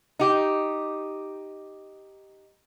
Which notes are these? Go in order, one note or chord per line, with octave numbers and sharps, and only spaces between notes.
D#4 G4